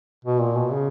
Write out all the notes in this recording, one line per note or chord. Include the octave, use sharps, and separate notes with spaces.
B2
A#2
B2
C#3